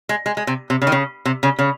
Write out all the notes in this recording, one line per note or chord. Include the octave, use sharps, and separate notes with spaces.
G#3
G#3
G#3
C3
C3
C#3
D#3
C#3
C3
C#3
C#3